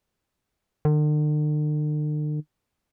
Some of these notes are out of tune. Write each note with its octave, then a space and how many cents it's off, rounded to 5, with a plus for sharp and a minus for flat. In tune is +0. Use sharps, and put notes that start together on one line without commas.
D3 +45